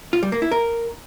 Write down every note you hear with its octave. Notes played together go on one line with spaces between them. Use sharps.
F4
G3
A#3
E4
A#4